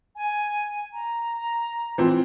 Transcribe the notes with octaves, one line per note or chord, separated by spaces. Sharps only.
G#5
A#5
E3 F3 C4